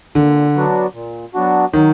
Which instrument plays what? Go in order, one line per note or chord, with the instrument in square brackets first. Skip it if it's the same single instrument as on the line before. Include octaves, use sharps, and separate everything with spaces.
[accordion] A#2 [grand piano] D3
[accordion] F#3 B3 D4 F#4
A#2
F#3 B3 D4 F#4
[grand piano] D#3 [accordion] F#3